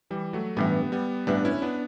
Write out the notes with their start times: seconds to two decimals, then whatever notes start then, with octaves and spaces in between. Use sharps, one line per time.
0.10 E3 G3
0.33 F#3 A3
0.57 A1 G2 E3 G3 B3
0.92 G3 B3
1.27 A1 G2 E3 B3 D4
1.45 C#4 E4
1.62 B3 D4